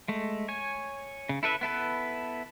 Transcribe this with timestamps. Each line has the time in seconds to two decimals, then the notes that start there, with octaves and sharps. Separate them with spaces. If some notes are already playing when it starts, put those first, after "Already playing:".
0.08 G#3 A3
0.48 C#5 G#5
1.29 C#3
1.43 E4 A4 B4 E5
1.61 B3 E4 A4 B4